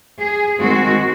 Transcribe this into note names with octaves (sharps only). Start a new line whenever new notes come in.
G#4
D#3 G#3 C4 F#4